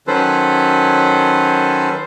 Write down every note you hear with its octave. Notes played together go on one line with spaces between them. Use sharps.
D#3 F#3 C#4 A4 B4 C5